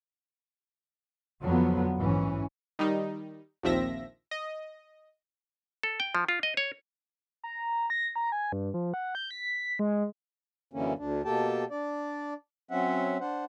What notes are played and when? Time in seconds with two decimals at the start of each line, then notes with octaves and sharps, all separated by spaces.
1.41 F2 D3 F3 F#3 B3
1.96 A#1 G#2 E3 C#4
2.79 D#3 G3 D#4
3.63 A#1 D#2 F3 C4 E5 A#6
4.31 D#5
5.83 A4
6.00 G5
6.15 F3
6.28 F4
6.43 D#5
6.57 C#5
7.44 A#5
7.90 A#6
8.16 A#5
8.32 G#5
8.52 G2
8.74 F3
8.94 F#5
9.15 G6
9.31 B6
9.79 G#3
10.73 F#2 D3 E3 A#3 C#4
10.98 D2 D4
11.25 B2 A#3 G4 A4 G5 A5
11.71 D4 D5
12.71 F#3 C4 C#4 E5 F#5
13.21 D4 C5 F#5